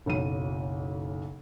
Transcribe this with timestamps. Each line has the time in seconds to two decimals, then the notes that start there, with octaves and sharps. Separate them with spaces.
0.06 F#1 B1 F#3 D#7